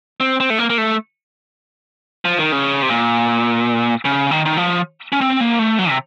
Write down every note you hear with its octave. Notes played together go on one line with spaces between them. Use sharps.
C4
C4
A3
A#3
A#3
A3
F3
D#3
C#3
C3
A#2
C#3
D#3
D#3
F3
C#4
C4
A#3
A3
F#3
C3